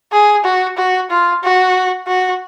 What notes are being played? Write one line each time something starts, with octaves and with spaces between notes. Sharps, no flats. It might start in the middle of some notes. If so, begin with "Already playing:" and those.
G#4
F#4
F#4
F4
F#4
F#4